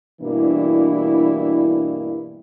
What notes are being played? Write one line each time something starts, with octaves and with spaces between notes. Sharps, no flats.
G2 B2 E3 A#3 D4 E4